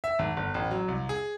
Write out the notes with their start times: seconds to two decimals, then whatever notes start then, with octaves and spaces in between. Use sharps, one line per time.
0.04 E5
0.19 G#1
0.37 G1
0.54 A1
0.71 F#3
0.88 C2
1.09 G#4